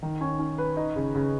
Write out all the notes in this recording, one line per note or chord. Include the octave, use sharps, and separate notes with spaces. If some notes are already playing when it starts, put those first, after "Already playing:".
D#3
C#4
C#4
B4
D#4
C#3
C#3